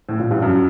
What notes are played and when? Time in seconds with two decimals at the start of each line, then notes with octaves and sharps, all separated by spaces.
0.09 A2
0.19 A#2
0.31 G2
0.42 F#2